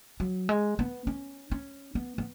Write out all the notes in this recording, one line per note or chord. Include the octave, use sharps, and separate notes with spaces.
F#3
G#3
B3
C#4
C#4
B3
B3